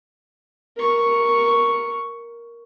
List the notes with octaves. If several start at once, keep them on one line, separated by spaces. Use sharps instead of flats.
A#4 C#6